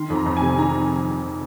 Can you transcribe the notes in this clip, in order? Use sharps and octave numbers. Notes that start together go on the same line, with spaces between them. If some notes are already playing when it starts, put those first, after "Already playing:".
Already playing: D#3 C6
F2
A#5
F2
G#5
C3
D#3 A#5